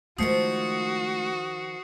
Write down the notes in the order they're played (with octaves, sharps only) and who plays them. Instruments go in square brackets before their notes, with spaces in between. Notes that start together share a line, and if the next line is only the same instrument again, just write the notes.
[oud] D#3 F3 [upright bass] G#3 A3 [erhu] F#4 [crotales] D#6 C7 C#7